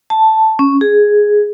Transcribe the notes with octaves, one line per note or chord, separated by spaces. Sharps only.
A5
C#4
G#4